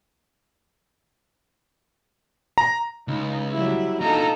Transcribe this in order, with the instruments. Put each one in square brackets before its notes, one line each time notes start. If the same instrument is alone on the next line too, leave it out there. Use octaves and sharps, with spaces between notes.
[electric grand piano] A#5
[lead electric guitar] C#2 [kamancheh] D#4
[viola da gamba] F#3 G3 [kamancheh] E4
[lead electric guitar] D4 F4 [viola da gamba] D#4 A4 [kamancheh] A#5